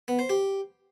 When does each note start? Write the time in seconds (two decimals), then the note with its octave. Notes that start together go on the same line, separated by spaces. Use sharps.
0.08 B3
0.19 C5
0.29 G4